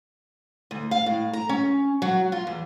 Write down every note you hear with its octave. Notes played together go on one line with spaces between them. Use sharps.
D2
F5
A2
A#5
C#4
F#3
F4
E2